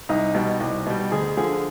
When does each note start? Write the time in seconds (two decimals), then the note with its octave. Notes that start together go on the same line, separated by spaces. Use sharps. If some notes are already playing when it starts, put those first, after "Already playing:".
0.09 C2 D#4
0.34 B2 G3
0.60 C2
0.86 B2 G3
1.12 D2 G#4
1.37 D3 F3 G#4